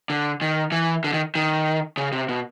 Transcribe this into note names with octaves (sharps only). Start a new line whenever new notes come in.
D3
D#3
E3
D3
D#3
D#3
C#3
C3
B2